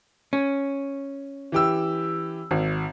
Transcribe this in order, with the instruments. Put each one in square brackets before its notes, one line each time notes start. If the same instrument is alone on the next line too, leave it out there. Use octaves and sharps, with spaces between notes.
[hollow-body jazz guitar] C#4
[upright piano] E3 G4 E6
G#1